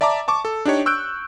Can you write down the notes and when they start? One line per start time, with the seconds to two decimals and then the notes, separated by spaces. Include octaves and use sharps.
0.01 D5 E5 A5 A#5 D6
0.28 A5 C#6 D6
0.45 A4
0.65 D4 D#4 G4 C#5
0.86 C#6 E6 F#6 G6 D7